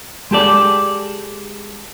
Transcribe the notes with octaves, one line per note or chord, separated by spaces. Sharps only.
G#3 G4 A4 D5